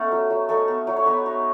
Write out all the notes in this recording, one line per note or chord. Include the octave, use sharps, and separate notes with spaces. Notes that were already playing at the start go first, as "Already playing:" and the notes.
Already playing: A3 B3 C#4 D#4 A4
F#3
F#3
A3 D#4 A4
B3
F#3
C#5
B3 D#4 B4
D#4